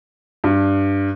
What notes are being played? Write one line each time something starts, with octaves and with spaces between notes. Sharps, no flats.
G2